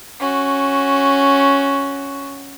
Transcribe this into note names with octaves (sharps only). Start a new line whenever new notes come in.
C#4 F#4